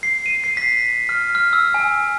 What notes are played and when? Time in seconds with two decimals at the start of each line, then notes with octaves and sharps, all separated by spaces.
0.03 C7
0.26 D#7
0.44 C7
0.57 B6
1.09 F6
1.35 F6
1.53 E6
1.74 G#5